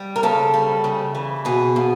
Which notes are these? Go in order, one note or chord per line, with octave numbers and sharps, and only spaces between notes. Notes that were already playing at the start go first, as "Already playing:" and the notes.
Already playing: G3
A#4
C#3 A4
G3
C#3
E3
B2 G#4
B2